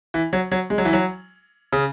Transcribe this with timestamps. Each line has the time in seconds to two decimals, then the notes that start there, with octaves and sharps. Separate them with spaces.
0.14 E3
0.33 F#3
0.51 F#3
0.70 G#3
0.78 F#3
0.85 E3
0.93 F#3
1.73 C#3